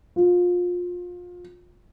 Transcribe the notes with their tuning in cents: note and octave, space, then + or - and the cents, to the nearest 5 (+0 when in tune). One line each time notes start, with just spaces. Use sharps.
F4 +25